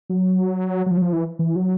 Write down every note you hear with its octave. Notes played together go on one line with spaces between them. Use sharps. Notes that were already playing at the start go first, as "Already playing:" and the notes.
F#3
F#3
F3
F#3
F3
E3
E3
F#3